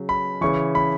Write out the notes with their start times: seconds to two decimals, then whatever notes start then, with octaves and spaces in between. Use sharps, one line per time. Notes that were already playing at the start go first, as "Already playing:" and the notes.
Already playing: C#3 F#3
0.09 B5
0.41 C#3 E3 C#6
0.75 B5